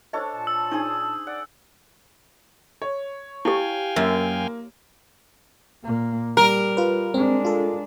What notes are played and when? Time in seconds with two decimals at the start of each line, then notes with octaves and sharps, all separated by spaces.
0.13 D4 A4 C5 C#5 D#5
0.34 A#2 A5
0.47 E6
0.71 D4 D#4 G#4 C5 C#6 D#6
1.27 D5 F#5
2.82 C#5
3.45 E4 G4 F5 G5 G#5
3.96 F#2 A#3
5.83 A#2 A#3
6.37 G3 A#4
6.77 F4 B4
7.14 G#3 C4 D4
7.45 F4 A4